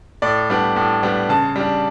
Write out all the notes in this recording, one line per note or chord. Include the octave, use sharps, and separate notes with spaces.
A2 D5
G3 B3 D4
A2
G3 B3 D4
C#3 A5
G3 D4